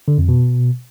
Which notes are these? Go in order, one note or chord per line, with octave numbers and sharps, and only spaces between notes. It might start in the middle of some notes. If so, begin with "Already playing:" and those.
D3
F2
B2